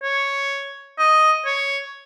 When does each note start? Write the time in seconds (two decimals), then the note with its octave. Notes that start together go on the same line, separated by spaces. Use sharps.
0.03 C#5
0.98 D#5
1.46 C#5